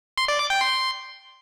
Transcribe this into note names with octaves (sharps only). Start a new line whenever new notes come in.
C6
D5
D6
G5
C6